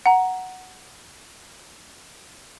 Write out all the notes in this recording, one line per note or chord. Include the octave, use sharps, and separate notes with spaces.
F#5 A#5